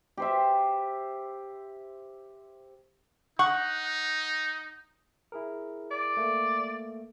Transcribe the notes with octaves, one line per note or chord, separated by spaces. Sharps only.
G4 C5 E5
D#4 F#5 C#6
E4 G#4 A#4
D5
A3 A#3